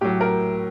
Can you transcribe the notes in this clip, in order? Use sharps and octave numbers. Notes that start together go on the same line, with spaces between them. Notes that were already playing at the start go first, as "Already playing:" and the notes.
A2 F#3 G4
A#4